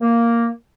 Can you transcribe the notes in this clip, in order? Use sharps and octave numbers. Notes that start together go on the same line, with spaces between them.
A#3